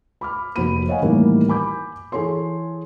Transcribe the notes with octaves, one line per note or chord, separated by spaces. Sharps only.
B5 D6 F6
F1 A#3 F#4 C5 B5 D#7
C#5 D#5 F5 F#5 G#5
A2 D#3 E3 G3 A#3
G#5 B5 D6 G6
E3 G#4 A4 C#5 C6